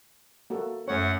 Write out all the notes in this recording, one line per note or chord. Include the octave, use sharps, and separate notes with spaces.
A#3 F#4 A4
F#2 A3 C#5 F#5